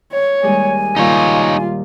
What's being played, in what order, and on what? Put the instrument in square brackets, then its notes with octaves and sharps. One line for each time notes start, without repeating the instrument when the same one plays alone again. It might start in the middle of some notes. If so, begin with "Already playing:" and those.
[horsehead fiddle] C#5
[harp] D#2 G3 G#3 [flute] G#5
[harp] A#2 D#3 G3 [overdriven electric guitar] D#4 C#5 [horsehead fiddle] F4